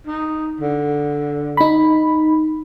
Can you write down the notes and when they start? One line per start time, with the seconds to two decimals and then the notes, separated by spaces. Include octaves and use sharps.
0.06 D#4
0.60 D3
1.57 D#4 B5